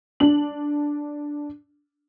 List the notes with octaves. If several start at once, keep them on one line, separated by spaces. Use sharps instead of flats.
D4 F#7